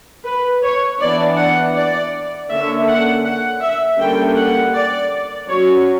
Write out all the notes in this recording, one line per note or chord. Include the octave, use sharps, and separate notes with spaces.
B4
C#5
E3 B3 D4 D5
F#5
D5
D3 A#3 C#4 E5
F#5
F#5
E5
D3 G3 A#3 C#4 G5
F#5
D5
F#3 C#4 C#5